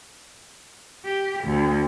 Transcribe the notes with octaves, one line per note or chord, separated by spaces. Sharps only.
G4
D2